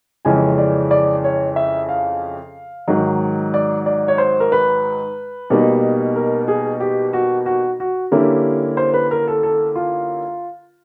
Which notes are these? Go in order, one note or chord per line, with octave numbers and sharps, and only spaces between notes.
F2 C#3 E3 G#3 C#4 G#5
D5
D5
C#5
E5
F5
G#2 D#3 F#3
D5
D5
C#5
C5
A#4
B4
B2 G3 A#3 D#4
A#4
G#4
G4
F#4
F#4
F#4
D3 G3 A#3 C#4 E4 G4
C5
B4
A#4
A4
A4
F4